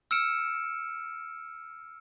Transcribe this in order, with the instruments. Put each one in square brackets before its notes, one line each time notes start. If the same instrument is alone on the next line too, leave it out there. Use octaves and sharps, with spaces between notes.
[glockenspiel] E6 F6 C#7 D7 E7